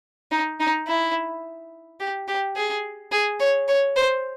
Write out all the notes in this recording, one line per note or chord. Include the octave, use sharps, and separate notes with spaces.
D#4
D#4
E4
G4
G4
G#4
G#4
C#5
C#5
C5